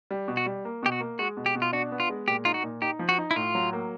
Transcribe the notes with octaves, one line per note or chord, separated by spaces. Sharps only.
G3
B2
F#4
G3
A#3
B2 G4
F#4
A#3
G#3 F#4
B2
G4
B2
F4
D4 F#4
B3
F4
G#3
A#2 G4
D#4 F4
F#4
A#2
D#4 G4
F3
F#4
D#4
E4
A2 F4
F#3
A#3